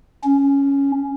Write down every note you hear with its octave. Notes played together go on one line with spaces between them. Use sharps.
C#4